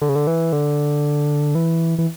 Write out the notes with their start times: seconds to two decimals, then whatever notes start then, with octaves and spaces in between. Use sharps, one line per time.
0.01 D3
0.09 C#3
0.16 D3
0.27 E3
0.52 D3
1.55 E3
1.99 E3